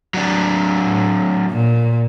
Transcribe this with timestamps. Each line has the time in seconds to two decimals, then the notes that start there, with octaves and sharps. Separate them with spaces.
0.14 F#3 D4
0.85 A2
1.51 A#2